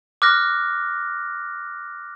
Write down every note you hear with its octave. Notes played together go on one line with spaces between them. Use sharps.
D6 F6 F#6 A#6